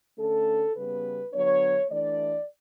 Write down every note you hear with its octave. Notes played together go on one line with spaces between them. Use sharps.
D3 A3 C#4 A4
C#3 G3 B3 B4
D3 F#3 B3 D4 C#5
E3 A3 D4 D5